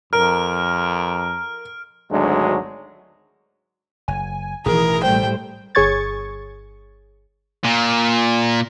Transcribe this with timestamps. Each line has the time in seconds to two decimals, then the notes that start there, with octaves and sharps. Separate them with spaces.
0.13 F2 A#4 F6 D7
2.11 G#1 D2 F#3 G#3 D4 F#4
4.08 F#1 G#5
4.66 A1 B2 D#3 E3 G#4 A#4
5.03 A2 G3 A3 C5 G5
5.75 G1 G#4 C#5 C#6 G#6 A6
7.64 A#2